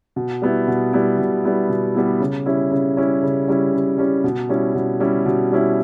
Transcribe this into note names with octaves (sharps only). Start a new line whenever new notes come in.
B2
G3 B3 E4
B2
G3 B3 E4
B2
G3 B3 E4
B2
G3 B3 E4
C#3
G3 C#4 E4
C#3
G3 C#4 E4
C#3
G3 C#4 E4
C#3
G3 C#4 E4
B2
G3 C#4 E4
B2
G3 C#4 E4
B2
G3 C#4 E4